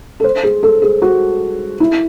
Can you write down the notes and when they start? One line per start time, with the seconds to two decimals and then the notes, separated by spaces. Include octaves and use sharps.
0.20 A4
0.24 C5
0.43 G#4
0.63 A4
0.82 G#4
1.02 F#4
1.80 E4